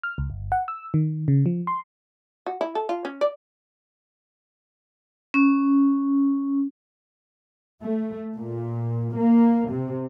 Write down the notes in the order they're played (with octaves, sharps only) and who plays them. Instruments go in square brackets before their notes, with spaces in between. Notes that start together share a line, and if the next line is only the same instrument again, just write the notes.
[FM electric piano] F6
C#2
G1
F#5
E6
D#3
C#3
F3
C6
[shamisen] F#4
E4
A4
F4
C#4
D5
[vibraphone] C#4
[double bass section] A3
A#2
A#3
C3